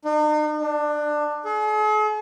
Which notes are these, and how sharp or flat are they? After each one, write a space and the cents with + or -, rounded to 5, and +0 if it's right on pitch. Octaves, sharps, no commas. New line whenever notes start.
D#4 -45
D4 +20
G#4 +45